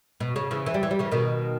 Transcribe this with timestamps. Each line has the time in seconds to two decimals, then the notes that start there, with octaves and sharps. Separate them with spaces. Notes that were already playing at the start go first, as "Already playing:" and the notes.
0.20 B2
0.36 C#3
0.51 C#3 E3
0.66 E3
0.74 G3
0.83 E3
0.91 G3
0.99 C#3 E3
1.11 B2 D#3